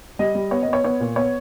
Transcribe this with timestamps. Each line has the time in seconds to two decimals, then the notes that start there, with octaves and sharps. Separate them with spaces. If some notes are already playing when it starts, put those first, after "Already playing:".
0.19 G3 D#5
0.35 G3
0.51 B3 C#5
0.62 D#5
0.67 B3
0.73 C#5
0.84 B3 C#5
1.00 A#2
1.16 B3 C#5